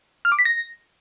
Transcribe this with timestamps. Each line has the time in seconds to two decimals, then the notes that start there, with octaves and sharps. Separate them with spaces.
0.25 F6
0.32 D6
0.39 B6
0.45 A#6